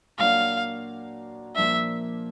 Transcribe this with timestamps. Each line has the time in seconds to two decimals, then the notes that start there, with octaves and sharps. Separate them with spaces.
0.19 A#2 F#3 A#3 D4 F#4 F5
1.56 A#2 F3 A#3 D4 E5